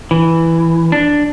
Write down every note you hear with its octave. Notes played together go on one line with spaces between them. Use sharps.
E3
D4